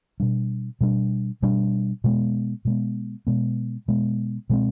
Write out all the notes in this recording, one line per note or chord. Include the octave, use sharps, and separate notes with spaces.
B2 G3 D4
B2 G3 D4
B2 G3 D4
B2 G#3 B3
B2 G#3 B3
B2 G#3 B3
B2 G#3 B3
B2 G#3 C4